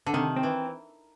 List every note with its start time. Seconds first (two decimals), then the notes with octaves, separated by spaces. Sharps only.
0.06 D3
0.14 C3 D#3
0.36 C4
0.43 E3